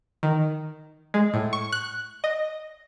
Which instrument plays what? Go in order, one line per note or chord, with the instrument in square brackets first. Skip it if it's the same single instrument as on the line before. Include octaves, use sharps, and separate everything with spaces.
[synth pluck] D#3
G#3
A2
C#6
F#6
D#5